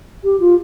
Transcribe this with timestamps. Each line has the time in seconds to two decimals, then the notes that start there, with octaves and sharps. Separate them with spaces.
0.24 G4
0.40 F4